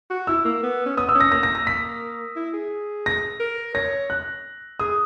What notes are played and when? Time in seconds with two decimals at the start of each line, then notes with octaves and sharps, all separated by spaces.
0.10 F#4
0.27 E4 E6
0.45 A#3
0.63 B3
0.86 C#4
0.97 B3 D#6
1.09 E6
1.15 C#4
1.20 A#6
1.32 A#3 A#6
1.43 A#6
1.55 A#6
1.67 B6
2.36 E4
2.53 G#4
3.06 A#6
3.40 A#4
3.75 C#5 A#6
4.10 F#6
4.80 G#4 D#6